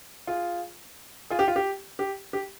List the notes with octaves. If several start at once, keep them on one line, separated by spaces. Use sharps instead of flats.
F4 G#4
F4 G#4
G4
F4
G4
G4
G4